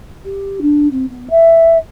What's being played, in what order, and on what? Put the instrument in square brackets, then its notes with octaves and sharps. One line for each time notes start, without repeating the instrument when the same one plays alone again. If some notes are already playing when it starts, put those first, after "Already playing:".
[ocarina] G4
D4
C4
B3
E5